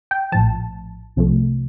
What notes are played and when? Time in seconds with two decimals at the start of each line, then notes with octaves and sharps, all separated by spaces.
0.11 G5
0.32 A#1 A2 F3 A5
1.16 C2 C3 F3 A3